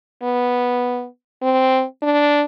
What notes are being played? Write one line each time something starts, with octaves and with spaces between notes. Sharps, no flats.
B3
C4
D4